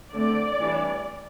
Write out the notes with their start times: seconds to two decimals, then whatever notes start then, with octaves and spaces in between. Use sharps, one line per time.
0.15 D3 A3 C4 D5
0.61 E3 G3 D4